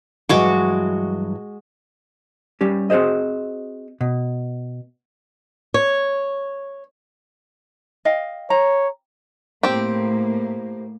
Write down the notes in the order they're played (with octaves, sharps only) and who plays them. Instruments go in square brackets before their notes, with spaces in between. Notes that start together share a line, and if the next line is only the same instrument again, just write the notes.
[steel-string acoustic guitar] G2 E3 F#3 [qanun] G#3 F#4 D6
[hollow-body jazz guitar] G3 C#4 G4
C4 F#4 G#4 C5 D#5
B2
[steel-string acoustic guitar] C#5
[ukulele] D#5 F5 G5
[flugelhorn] C#5 [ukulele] A#5
[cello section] A2 A#3 [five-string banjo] C4 G4